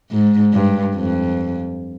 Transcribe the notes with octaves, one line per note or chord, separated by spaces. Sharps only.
G#2
G2
F2